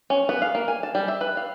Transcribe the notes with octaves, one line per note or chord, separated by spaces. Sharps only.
C#4
B3
F5
A#3
G#5
A5
G3
E5
B4
F5